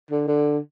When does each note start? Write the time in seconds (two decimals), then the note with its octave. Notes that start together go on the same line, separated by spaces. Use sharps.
0.11 D3
0.28 D3